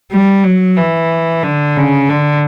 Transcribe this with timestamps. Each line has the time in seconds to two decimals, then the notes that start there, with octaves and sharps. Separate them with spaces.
0.12 G3
0.44 F#3
0.77 E3
1.43 D3
1.76 C#3
2.09 D3